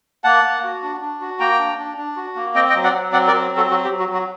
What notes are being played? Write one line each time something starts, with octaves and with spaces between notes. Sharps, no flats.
A#3 F#5 A5
A#3
F#4
D4
D4
F#4
A#3 G5 A#5
D4
D4
D4
F#4
A#3
C4 D#5 G5
D#5 G5
F#3
D5 F#5
F#3
C4 D5 F#5
A#4 D5
F#3
C4
F#4 A4
F#3 F#4
G4
F#3
F#4
F#3 F#4